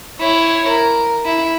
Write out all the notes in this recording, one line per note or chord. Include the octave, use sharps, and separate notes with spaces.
E4 C#5
A#4
E4